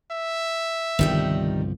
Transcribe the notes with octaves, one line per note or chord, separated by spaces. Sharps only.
E5
G1 C2 D#3 F3 G3 D#4